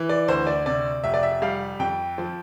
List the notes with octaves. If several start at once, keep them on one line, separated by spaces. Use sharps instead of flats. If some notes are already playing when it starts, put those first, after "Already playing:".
Already playing: E3
D5
D2 C5
D5
C3 D5
F1 E5
D5
E5
G3 F5
F2 G5
F3